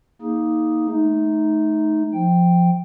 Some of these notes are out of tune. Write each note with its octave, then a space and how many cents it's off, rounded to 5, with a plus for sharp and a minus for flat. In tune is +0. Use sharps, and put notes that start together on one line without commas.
A#3 +5 D#4 +20 G#4 +0
A3 -30 D#4 +0
F3 +0 G5 +0